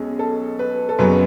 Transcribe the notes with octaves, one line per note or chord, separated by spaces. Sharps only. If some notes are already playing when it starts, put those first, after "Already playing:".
Already playing: B1 B2 G#3 C#4 G#4
A4
B4
A4
F#1 F#2 C#3 F#3 B3 B4